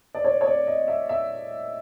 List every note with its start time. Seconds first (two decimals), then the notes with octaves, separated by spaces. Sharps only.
0.15 D5
0.24 C#5
0.41 C#5
0.46 D5
0.67 D#5
0.88 E5
1.09 E5